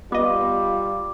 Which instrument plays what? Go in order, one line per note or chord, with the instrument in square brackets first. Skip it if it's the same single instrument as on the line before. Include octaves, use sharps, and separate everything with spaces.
[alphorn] G3 [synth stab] B3 D#5 [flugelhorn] F4 [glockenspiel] D6